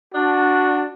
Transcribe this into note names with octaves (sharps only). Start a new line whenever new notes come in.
D4 F#4